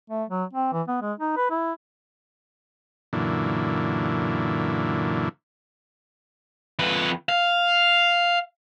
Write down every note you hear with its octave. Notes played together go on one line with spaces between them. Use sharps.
A3
F#3
C4
E3
B3
G#3
D#4
B4
E4
F#2 A#2 D3 E3
F2 B4
F5